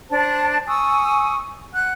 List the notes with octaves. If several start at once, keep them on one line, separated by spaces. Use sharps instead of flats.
D4 C5 A5
G#5 C#6 D#6 E6
F#5 F#6